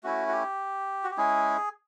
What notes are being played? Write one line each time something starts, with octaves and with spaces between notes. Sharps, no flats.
A3 C#4 E4 F#4
F#4
G4
F#4
G4
G#3 C#4 E4 G#4